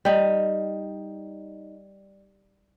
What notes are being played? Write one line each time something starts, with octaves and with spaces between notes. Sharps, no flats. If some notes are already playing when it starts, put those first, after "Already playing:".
G3 D#4